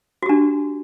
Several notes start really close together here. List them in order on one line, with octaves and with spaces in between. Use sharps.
F#4 G4 D4